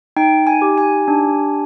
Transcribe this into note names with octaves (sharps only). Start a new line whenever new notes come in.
D#4 G5
G#5
G4
G#5
D4